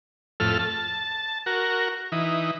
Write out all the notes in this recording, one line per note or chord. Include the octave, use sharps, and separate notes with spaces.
F2 A2 A4 F6
A5
F#4 A#4
E3 D#4